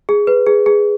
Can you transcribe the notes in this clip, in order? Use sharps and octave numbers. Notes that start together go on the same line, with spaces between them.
G#4
B4
G#4
G#4